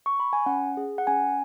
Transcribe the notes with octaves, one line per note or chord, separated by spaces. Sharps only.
C#6
B5
G#5
C#4 F#5
G#4
F#5
C#4 G#5